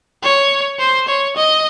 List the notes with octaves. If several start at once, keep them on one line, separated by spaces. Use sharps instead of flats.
C#5
C5
C#5
D#5